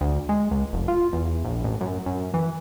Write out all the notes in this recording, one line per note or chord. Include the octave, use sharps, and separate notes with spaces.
D2
G#3
C#2
F1
F4
E2
A#1
A1
F#2
F#2
E3